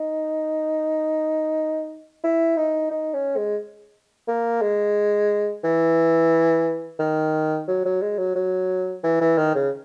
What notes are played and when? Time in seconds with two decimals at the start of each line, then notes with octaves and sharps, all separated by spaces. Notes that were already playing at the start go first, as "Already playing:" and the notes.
Already playing: D#4
2.23 E4
2.57 D#4
2.90 D#4
3.14 C#4
3.37 G#3
4.28 A#3
4.61 G#3
5.63 E3
6.99 D#3
7.68 F#3
7.85 F#3
8.02 G#3
8.18 F#3
8.35 F#3
9.03 E3
9.21 E3
9.38 D#3
9.55 C#3